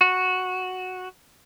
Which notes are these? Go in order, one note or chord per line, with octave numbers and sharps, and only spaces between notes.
F#4